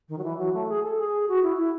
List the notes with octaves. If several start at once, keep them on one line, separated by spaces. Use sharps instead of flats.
D#3
F#3
E3
F#3
A3
G#4
A4
G#4
F#4
E4
E4